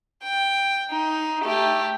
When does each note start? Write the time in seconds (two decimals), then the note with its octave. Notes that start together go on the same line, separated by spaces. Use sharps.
0.23 G5
0.91 D#4
1.43 A3 G4